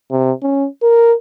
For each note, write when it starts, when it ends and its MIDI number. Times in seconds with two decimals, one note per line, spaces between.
0.11 0.32 48
0.43 0.67 61
0.83 1.14 70